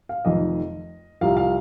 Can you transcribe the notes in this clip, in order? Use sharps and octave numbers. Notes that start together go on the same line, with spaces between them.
F5
F1 F2 D#3 D#5
C2 C3 F3 F5
F5